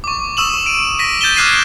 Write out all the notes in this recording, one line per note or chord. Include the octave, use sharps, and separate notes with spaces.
C#6 D6
C#6 D#6 E6 E7 F#7
D7 D#7
A#6 B6 D#7
G6 A6 D#7 E7 G7
D6 F6 F#6 G#6 C7 D#7